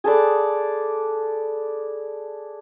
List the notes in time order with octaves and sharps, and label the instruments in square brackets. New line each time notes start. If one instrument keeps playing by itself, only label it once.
[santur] G#4 A4 B4 D5